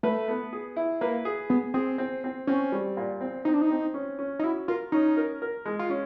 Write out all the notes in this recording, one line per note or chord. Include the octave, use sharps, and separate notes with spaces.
A3 B4
B3
G#4
E4
A#3 B4
G#4
B3 G#4
C4 G#4
C4
C4
C4 C#4
G3
A#2
C4
C4 D#4
D4
D#4
C4
C#4
C#4
D#4
E4 F#4
F4 A#4
C#4 D#4
A#4
A#4
G#3
F4
C#4